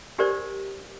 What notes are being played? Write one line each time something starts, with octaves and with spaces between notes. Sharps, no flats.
D4 G4 A#4 C5 D5